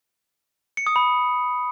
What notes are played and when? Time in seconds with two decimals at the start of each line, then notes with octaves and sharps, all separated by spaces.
0.77 C#7
0.87 D#6
0.96 B5